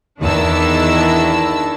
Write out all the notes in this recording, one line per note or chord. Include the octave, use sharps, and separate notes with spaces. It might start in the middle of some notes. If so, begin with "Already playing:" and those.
E2 D#3 D4 E4 A5 E6